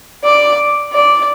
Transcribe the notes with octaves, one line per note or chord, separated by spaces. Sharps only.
D5
D5